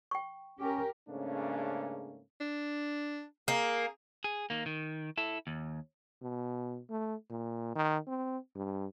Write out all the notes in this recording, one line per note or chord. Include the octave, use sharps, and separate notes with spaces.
G5 C#6
C#4 G4 A#4
G#2 C#3 A3 A#3 C#4 D4
D4
A#3 G#4
G#4
D#3 A#3
D#3
E4 A4
D#2
B2
A3
A#2
D#3
C4
G2